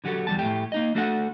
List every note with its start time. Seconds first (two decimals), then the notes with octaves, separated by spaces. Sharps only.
0.04 D3 F#3 F#4 G4 A4
0.27 E2 G3 A5
0.39 A2 A3 G4
0.72 A#3 D#4 D#5
0.95 A3 D4 F#4 A4 C#5 F#5